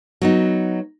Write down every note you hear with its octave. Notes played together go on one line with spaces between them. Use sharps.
F#3 B3 D#4